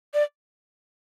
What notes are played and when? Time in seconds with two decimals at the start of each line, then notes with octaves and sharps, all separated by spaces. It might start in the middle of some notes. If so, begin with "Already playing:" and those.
0.14 D5